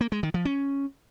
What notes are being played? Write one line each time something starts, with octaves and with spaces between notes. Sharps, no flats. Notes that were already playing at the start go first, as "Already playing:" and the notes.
A#3
G#3
D#3
F3
C#4